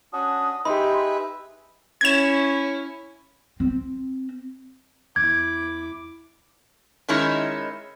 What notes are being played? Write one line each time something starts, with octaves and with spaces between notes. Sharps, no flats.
C#4 D4 F#4 D#6
D#4 G4 G#4 B4 E5 B5 C6
C#4 E4 C#5 G#6 E7
C4
E2 E4 D6 G#6
D#3 G#3 C#4 D#4 E4